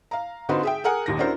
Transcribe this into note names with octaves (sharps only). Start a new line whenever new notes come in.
F5 A#5
D3 C4 D#4 F4 F#4 B4
G#4 E5 G5
G#4 A#4 F#5 G#5
D#1 D#2 A#6
C#4 D4 E4 F#4 A#4 C5